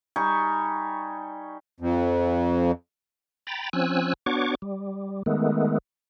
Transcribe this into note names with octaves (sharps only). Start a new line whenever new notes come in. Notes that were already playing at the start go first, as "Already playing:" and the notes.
G3 D#4 G#5 C#6
F2
G5 A#5 B5 A6
F3 C4 C#4 G#5 E6 F#6
B3 D4 F#4 C#5 C#6 D6
G3
D#3 G#3 A3 B3